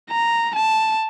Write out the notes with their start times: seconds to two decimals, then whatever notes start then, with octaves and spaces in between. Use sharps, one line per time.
0.11 A#5
0.55 A5